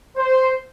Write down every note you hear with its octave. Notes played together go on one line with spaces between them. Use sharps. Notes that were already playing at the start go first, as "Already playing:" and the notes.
C5